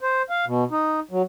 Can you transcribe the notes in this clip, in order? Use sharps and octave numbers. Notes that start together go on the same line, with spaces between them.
C5
F5
B2
D#4
F#3